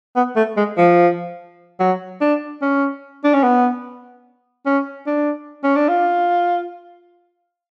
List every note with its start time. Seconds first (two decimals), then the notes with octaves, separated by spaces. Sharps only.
0.16 B3
0.36 A3
0.57 G#3
0.77 F3
1.80 F#3
2.21 D4
2.62 C#4
3.24 D4
3.33 C#4
3.43 B3
4.66 C#4
5.06 D4
5.64 C#4
5.76 D4
5.88 F4